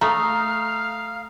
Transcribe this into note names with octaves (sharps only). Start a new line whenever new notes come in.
A3 F5 A#5 D#6 F6